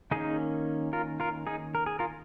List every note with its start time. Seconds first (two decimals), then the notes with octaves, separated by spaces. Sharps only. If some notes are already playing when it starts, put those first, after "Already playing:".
0.11 D#3 A#3 C#4 D#4 G#4
0.93 F4 A#4
1.20 F4 A#4
1.47 D#4 G#4
1.75 A#4
1.86 G#4
1.99 F4 A#4